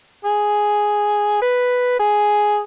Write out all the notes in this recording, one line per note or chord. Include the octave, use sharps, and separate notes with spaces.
G#4
B4
G#4